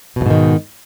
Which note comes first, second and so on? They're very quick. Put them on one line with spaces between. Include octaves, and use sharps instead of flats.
B2 E2 G#2 D#3